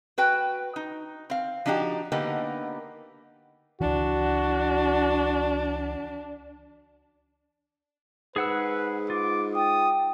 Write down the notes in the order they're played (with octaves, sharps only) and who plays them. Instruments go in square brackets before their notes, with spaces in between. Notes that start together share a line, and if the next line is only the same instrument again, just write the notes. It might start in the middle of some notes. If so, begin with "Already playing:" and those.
[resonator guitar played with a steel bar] F#4 B4 G5
D#4
C4 F5
F3 D4 D#4 F#4 G4
D3 A#3 B3 D#4 G4
[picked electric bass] C#2 E3 [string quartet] D4 [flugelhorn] F#4
[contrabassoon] G#2 [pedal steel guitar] G#4 F#5 E6 [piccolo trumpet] B4
[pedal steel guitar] F4 [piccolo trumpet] D6
[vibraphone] G5 [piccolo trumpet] D#6